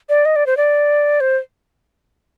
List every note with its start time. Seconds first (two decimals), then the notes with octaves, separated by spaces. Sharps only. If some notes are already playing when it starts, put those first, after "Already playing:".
0.09 D5
0.25 D#5
0.36 D5
0.46 C5
0.57 D5
1.20 C5